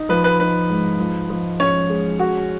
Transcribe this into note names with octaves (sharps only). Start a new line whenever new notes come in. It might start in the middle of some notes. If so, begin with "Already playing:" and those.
Already playing: D#4
F3 B4
B4
D#4 B4
G#2
F3
F3
C#4 C#5
G#3
F#4